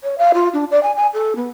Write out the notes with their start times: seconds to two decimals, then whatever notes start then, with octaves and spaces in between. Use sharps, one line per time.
0.03 C#5
0.18 F5
0.33 F4
0.53 D4
0.70 D5
0.83 G#5
0.96 G#5
1.13 A4
1.35 B3